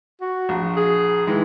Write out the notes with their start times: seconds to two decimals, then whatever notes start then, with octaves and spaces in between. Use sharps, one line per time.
0.21 F#4
0.49 A#1
0.76 G#4
1.27 D#3 E3 G#3